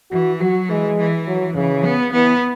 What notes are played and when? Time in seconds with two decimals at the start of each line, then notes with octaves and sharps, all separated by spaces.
0.11 E3 F#4
0.40 F#3 F#4
0.69 E3 G#3
0.98 E3
1.27 F#3
1.55 C#3 E3
1.85 B3
2.13 E3 B3